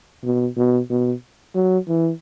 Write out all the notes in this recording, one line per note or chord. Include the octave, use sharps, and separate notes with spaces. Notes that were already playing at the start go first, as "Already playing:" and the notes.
B2
B2
B2
F#3
E3